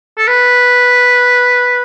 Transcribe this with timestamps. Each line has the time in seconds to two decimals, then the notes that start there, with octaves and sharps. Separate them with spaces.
0.18 A4
0.27 B4